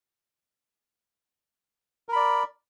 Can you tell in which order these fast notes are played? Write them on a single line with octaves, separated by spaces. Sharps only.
A#4 B5 D5